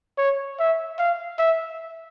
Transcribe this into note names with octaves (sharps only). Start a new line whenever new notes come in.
C#5
E5
F5
E5